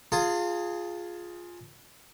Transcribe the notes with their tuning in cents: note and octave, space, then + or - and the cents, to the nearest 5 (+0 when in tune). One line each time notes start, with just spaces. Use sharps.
F4 +5 G#4 +0 A5 +40